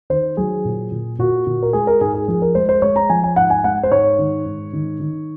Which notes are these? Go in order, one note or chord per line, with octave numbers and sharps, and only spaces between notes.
D#3 C5
F#3 G#4
A#2
A#2
A#2 F#4
A#2
A#4
G#3 G#4
A#4
G#2 G#4
G#4
F3 G#4
A#4
G#3 C5
C5
G#3 C#5
A#5
F3 G#5
G#5
G#2 F#5
G#5
G#3 F#5
C5
G#2 C#5
D#3
G#2
D#3
D#3